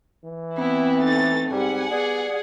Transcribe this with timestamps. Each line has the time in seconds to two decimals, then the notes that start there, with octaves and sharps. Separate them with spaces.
0.24 E3
0.58 B3 C4 E4
1.02 A3 D#4 A6
1.51 G#2 G3 F#5 G#5
1.91 B3 G#4 D5